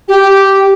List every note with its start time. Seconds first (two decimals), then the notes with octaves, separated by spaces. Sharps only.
0.08 G4